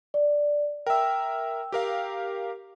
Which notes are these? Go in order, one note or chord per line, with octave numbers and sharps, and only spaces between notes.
D5
A#4 E5 G5 E6
G4 A#4 F5